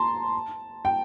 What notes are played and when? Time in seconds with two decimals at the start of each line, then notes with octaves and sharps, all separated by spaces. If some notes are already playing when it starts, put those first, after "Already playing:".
Already playing: A5 A#5 C6
0.85 G5